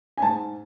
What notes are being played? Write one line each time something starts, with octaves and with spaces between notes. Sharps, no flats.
G#5
G#2 A5